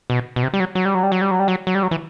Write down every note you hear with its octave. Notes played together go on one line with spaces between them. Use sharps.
B2
B2
C3
G3
F#3
F#3
G3
F#3
G3
F#3
G3
F#3
G3
F#3
F#3
G3
F#3
E3